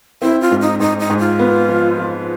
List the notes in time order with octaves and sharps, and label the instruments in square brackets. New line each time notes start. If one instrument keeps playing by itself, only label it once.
[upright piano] C4 [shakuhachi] E4
[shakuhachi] F4
[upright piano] G#2
[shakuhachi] D#4
[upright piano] G#2 [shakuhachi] D#4
[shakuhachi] D#4
[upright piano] G#2
[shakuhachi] F4
[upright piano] B3
F3
F3